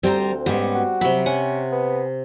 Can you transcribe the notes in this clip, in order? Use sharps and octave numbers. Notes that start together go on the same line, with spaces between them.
D2 G3 C4 C5 A#5
G#2 G3 B3 C#4
F#4
C3 F#3 B5
C#4 F#5 G#5
B3